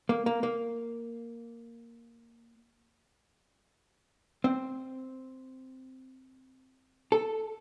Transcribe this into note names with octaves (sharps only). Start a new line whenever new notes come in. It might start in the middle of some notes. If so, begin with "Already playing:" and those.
A#3
A#3
A#3
C4
A4